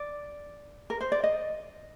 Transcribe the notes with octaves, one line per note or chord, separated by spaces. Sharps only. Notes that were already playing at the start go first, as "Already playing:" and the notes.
Already playing: D5
A#4
C5
D5
D#5